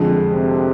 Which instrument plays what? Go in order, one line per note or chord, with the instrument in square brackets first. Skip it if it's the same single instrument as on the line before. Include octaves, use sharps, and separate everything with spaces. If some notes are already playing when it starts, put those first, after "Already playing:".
Already playing: [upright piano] F2 D3 F3 G#3
[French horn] C3